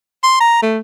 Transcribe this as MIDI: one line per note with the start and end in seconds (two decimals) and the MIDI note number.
0.23 0.37 84
0.40 0.61 82
0.62 0.79 57